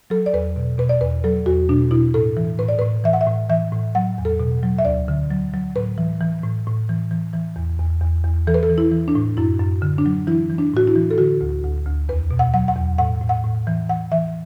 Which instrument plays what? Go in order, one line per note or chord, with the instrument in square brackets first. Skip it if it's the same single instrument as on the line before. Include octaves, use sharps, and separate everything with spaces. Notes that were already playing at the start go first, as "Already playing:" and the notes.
[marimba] F#3 A4
D5
E2 B4
B2
B2 B4
D5
E2 B4
F#3 A4
E2 F#4
B2 D4
B2 E4
A2 A4
E3
A2 B4
D5
A2 B4
E3 E5
F#5
E5
A2
E3 E5
A2
F#3 F#5
E2
A4
B2
F#3
E5
D2 D5
D3
F#3
F#3
A2 B4
E3
E3
A2
A2
E3
E3
E3
E2
E2
E2
E2
E3 A4
B4
A4
E3
E4
E3
D4
A2
F#2 E4
F#2
D3
D4
F#3
E3 E4
E3
D4
A2 F#4
E4
E3
A4
D3 F#4
D2
D2
D2
E2 B4
B2
F#5
F#3 F#5
F#5
E2
A2 F#5
A2
F#5
A2
E3
E3 F#5
E3 E5